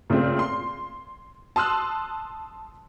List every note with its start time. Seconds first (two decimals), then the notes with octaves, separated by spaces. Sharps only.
0.10 A#2 C#3 A3 C4
0.39 C6
1.56 A5 C6 D#6 E6 F#6